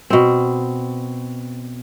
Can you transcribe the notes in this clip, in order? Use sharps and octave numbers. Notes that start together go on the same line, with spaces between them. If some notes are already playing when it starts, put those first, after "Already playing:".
B2 C4